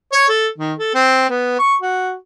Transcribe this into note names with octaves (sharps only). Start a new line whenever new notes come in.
C#5
A4
D#3
A4
C4
B3
C#6
F#4